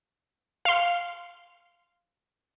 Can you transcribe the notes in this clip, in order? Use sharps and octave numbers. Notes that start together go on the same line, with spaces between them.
F5 C6